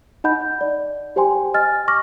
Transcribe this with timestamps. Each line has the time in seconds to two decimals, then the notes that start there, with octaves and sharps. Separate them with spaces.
0.24 D#4 D#5 F#5 B5 G6
0.61 D5
1.16 G4 C5 G5 G#5 C6
1.54 D#5 G#5 F6 A6
1.88 C#6 D6 F6 A#6